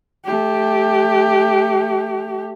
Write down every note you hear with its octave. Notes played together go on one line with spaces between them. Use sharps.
A3 G4